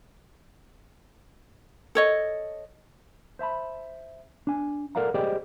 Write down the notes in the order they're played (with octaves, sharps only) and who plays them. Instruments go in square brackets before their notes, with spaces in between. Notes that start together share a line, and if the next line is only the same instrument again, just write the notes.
[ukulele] A4 C#5 D#5
[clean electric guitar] C5 E5 A5 B5
D4 G#5
A4 A#4 D5 F5 F#5 A#5
G4 G#4 C5 D5 D#5 G5